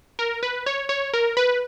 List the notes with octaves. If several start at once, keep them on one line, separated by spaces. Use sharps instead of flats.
A#4
B4
C#5
C#5
A#4
B4